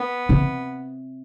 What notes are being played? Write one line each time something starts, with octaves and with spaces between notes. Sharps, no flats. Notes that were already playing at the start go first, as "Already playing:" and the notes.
Already playing: B3
C3